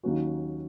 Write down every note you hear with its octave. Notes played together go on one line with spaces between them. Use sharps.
D#2 D#3 F#3 C#4 F#4